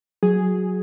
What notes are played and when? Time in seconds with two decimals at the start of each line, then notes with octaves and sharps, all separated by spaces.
0.23 F#3 G#4